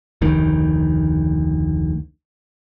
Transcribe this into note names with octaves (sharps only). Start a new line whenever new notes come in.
F1 D2 D#3